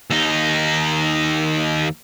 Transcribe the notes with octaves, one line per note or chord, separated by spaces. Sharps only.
D#2 D#4